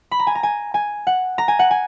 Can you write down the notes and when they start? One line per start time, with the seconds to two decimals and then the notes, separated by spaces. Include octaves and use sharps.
0.11 B5
0.19 A#5
0.27 G#5
0.35 A#5
0.43 G#5
0.74 G#5
1.07 F#5
1.38 A#5
1.48 G#5
1.59 F#5
1.71 G#5